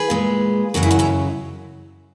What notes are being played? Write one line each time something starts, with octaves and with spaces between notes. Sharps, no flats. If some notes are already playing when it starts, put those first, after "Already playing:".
Already playing: G#4 B4
A#2 G#3
F#2 C#3 F#3 F#4 A#4
E4 G#4
D#4 F#4
C#4 E4